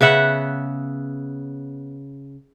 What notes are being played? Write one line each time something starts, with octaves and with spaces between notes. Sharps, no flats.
C#3 B3 E5 F#5